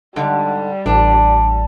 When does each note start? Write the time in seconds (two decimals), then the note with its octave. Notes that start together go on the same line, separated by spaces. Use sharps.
0.16 G#2 D3 G3
0.86 A1 D4